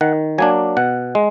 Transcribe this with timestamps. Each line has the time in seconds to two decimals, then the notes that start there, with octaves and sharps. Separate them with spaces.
0.01 D#3 F#5
0.38 F#3 A#3 D4 G#5
0.77 B2 F#5
1.15 G#3